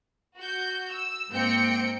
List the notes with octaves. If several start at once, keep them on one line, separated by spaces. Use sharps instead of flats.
F#4 G6
E6
G#2 A#3 C4 G5 G6 C#7